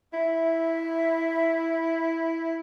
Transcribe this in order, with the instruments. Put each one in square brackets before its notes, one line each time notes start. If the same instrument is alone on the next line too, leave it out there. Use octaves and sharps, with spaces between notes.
[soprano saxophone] E4 [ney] E5